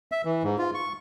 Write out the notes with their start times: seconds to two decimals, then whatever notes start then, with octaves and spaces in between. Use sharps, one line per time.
0.12 E5
0.25 E3
0.43 G#2
0.58 F4
0.74 C#6